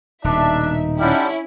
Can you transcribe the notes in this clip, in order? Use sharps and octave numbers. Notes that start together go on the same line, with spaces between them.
D#1 B2 D4 D#4 E5
D3 G3 C#4 E4